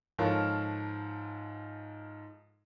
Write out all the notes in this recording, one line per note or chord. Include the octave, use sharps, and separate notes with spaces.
G#2 F3 F4 A4 A#4 C#5